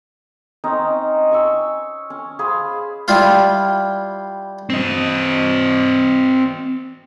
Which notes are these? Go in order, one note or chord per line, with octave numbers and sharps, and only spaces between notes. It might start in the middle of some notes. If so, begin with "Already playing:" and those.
C4 C#4 D#4
G#5 C#6 E6
C#4
G#4 C5 F5 B5
G3 E4 F4 F5
C4 D#5